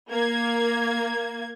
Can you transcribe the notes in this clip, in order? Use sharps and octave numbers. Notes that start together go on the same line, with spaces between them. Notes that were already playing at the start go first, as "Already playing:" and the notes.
A#3 G#6